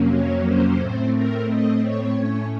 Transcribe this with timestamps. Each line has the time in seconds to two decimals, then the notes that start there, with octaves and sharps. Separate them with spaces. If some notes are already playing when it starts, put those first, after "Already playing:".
Already playing: F2 C3 F#3 A#3 C#4
0.11 C#5
0.45 C5
0.79 A2 A3 C4
1.14 A#4
1.48 D#5
1.82 C#5
2.17 A2 A3 C#4